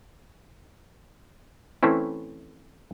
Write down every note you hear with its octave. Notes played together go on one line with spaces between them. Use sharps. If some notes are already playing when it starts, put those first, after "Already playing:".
E3 A3 C4 C#4 E4